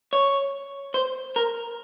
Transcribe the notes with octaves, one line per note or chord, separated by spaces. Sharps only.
C#5
C5
A#4